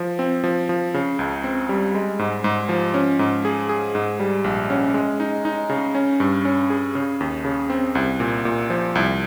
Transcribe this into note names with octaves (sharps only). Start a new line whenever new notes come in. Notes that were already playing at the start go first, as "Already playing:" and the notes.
Already playing: F3
C4
F3
F3
C#3
C#2
C4
G3
G#3
G#2
G#2
F3
C#4
G#2
G#4
G#4
G#2
G3
A#1
C#4
G#3
D#4
D#4
C#3
C#4
G2
C#4
G#4
C#3
D#2
C#3
C4
C2
A#2
A#2
F3
C2